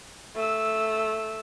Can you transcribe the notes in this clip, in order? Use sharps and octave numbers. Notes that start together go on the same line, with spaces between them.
A3 E6